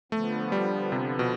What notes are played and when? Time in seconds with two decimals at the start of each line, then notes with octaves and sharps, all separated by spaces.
0.12 D3 F3 A3 B3
0.52 G3
0.92 C3
1.19 B2